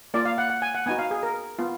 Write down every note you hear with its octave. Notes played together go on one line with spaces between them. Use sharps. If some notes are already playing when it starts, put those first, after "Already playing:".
A#3 F4 D5
F5
F#5
F#5
G#5
F#5
B3 D#4 F#4 G#5
F5
G#4
A#4
B3 F4